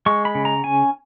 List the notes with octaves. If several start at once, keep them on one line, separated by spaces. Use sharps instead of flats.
G#3 C#6
B5
C#3
A#5
C#4 G#5